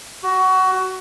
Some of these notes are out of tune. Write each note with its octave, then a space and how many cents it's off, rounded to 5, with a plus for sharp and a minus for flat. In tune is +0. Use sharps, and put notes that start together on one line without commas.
F#4 +20